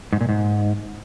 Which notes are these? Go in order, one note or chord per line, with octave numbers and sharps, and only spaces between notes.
G#2
A#2
G#2